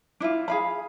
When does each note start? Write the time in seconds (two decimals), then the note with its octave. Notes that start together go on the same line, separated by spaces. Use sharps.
0.20 D4 E4 F4
0.48 G#4 F5 B5